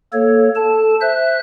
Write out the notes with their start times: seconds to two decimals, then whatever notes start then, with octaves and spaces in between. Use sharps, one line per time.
0.13 A#3 A4 C#5
0.56 A4 A5
1.01 C5 E5 F#6